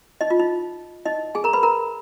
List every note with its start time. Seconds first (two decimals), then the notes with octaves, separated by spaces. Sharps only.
0.21 D#4 D#5
0.30 F4
0.40 D#4
1.05 D#4 D#5
1.35 G#4 G#5
1.44 A#4 A#5
1.53 B4 B5
1.63 A#4 A#5